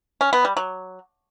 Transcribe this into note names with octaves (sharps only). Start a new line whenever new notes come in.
C#4
B3
G3
F#3